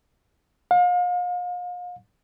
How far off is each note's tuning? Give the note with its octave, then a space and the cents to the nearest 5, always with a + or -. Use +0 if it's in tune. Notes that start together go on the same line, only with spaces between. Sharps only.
F5 +40